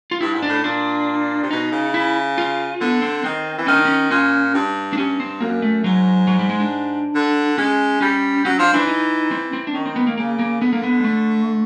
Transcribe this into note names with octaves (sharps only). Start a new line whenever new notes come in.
F4
G2 E4
G#2
D4
A2
A#2 D4
C3
B2 D#4
C#3
E4
F4
D3 B3
C4
D#3 C4
E3
D#3 C#4
D4
C#4
A#2 C#4
G2
D4
G2 C#4
C4
F#2 A#3
A3
G#2 F#3
F#3
G3
G#3
D4
D3
G#3 C#4
G3 C#4
F#3 C#4
F3 D4
E3 D4
D#4
C4
C4
D4
D#3 C#4
C4
B3
A#3
C#3 A#3
A#3
D3 B3
A#3
B3
G#3
A3